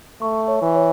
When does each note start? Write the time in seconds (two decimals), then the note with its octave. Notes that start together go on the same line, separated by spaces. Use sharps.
0.21 A3 C#6
0.48 C#5
0.62 E3
0.76 C#5